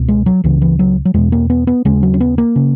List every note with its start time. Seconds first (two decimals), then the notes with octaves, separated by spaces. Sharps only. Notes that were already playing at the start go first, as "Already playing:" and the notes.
Already playing: C#2 B2
0.08 G#3
0.26 F#3
0.44 C#2 C#3 E3
0.61 E3
0.79 F#3
1.05 F#3
1.14 E2 B2 G#3
1.32 A#3
1.50 B3
1.67 B3
1.85 D#2 C#3 G#3
2.03 F#3
2.14 C#4
2.20 B3
2.38 A#3
2.56 C#3